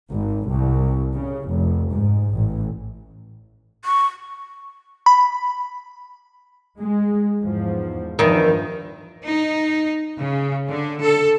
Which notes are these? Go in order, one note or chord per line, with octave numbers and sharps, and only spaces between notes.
G#1
C2
C#3
F1
G#2
A1
C#6
B5
G#3
E2 G#2 F3
E2 G2 D#3 F3
D#4
C#3
D3
A4